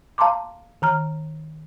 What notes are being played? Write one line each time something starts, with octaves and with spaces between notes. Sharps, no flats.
F5 A5 A#5 C6 D6
D#3 A#5 F6